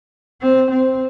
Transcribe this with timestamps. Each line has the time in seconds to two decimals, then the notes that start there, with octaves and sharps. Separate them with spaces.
0.42 C4
0.70 C4